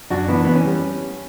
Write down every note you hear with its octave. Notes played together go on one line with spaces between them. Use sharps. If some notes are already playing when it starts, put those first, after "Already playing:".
F#2 D4 F#4
E3 B3 D4
E3 B3
C#4
G3